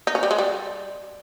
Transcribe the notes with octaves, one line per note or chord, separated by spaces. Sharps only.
D#4
C#4
G3
G#3
G3